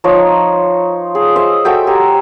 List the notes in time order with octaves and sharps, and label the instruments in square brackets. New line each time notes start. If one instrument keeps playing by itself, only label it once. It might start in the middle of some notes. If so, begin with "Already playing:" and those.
[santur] F3 D#4 C#5 A#5
G#4
C5 D#5 E5
F#4 A4 E5 G5
G4 G#5 A#5